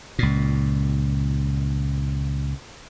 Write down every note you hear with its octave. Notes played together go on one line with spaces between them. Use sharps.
C#2 A#2